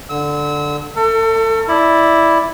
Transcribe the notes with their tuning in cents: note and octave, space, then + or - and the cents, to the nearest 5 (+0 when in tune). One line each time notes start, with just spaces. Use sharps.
D3 +0 E6 -30
A3 +0 A4 +35
E4 +0 D5 +0